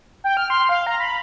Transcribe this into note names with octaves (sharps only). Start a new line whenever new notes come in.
G5
F6
C6
F5
A#5
B5